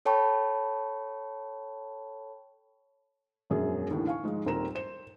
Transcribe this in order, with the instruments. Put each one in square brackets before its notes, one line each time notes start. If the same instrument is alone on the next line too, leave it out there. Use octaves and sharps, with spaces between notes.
[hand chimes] A4 C#5 G5 A5 B5 C#6
[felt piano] E1 A#1 F#2 G#4
D#2 A2 D3 E3
F5 G#5 C#6
G#2 F3 G#3
D#1 D#2 C4 A#4 A#5 E7
C5 E7